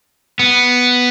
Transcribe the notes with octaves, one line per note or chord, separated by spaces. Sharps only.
B3